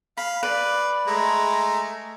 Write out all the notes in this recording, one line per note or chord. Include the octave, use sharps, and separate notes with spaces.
F5 B5
B4 D5
G#3 A3 A#5